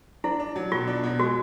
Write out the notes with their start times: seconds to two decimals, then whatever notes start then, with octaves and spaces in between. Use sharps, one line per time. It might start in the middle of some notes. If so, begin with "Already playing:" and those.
0.24 D4 E4
0.40 D4
0.56 F#3
0.72 B2 F4
0.87 D4
1.03 B2
1.19 G#3 F#4